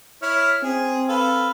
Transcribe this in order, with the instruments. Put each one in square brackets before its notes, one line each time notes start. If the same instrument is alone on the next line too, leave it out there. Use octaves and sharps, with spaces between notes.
[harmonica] E4 C#5 F6
[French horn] C4 [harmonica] G#4
[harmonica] A4 B4 F5